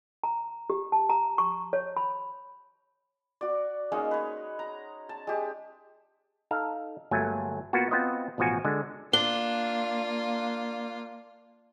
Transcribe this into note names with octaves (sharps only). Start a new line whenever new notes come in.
A#5
G4
A5
A#5
C#6
C#5
B5
F#4 D5
G#3 A#3 C#4 D#4
B4 C#5
A#5
A5
G#3 G4
D#4 A4 F5
G1 F#3 A3 A#3 G#5
A#3 B3 F4 F#4
B3 C4 F4 B4 C5 D#5
A1 B2 F3 F#4 G#5
D3 G#3
A#3 D4 F4 G7